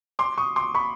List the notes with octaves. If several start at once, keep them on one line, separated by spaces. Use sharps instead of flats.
C6 D6
C#6 D#6
C6 D6
B5 C#6